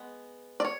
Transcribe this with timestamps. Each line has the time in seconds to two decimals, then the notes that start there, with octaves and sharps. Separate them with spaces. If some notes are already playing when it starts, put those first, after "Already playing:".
Already playing: G#3 B3
0.60 D5
0.65 C#5